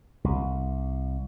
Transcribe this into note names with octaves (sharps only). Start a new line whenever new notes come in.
C2